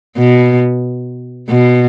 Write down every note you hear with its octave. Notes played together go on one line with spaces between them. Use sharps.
B2
B2